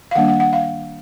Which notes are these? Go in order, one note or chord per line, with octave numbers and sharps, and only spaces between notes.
F5
D#3 G3 A#3 D4 F#5
F#5
F#5
F5